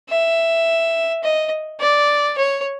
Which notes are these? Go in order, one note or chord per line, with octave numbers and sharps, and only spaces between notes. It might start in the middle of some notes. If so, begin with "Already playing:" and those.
E5
D#5
D5
C#5